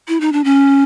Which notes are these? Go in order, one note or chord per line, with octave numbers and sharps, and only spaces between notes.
E4
D#4
D4
C#4